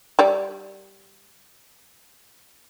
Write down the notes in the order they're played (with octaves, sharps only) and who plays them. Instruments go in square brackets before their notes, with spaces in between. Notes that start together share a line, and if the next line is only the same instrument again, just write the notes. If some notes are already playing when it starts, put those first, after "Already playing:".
[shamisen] G3 G4 D5